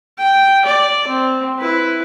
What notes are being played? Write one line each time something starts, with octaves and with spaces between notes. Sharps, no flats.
G5
D5
C4
E4 B4